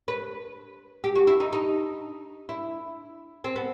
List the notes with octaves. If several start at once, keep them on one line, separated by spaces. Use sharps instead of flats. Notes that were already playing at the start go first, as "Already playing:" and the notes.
B4
G4
F#4
E4
D#4
D#4
E4
C4
B3